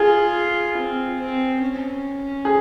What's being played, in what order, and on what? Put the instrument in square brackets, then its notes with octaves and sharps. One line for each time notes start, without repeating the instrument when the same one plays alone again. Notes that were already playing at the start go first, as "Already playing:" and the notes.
Already playing: [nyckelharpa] F4 [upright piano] G#4
[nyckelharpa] C4
C4
C#4
[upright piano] G#4